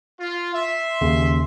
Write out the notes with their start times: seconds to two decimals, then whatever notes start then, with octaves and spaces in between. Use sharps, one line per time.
0.20 F4
0.54 E5 C6
1.01 D#2 C#3